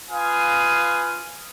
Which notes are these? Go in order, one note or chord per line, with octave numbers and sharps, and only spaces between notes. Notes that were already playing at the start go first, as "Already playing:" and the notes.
F4 B4 F5 G#5 D#6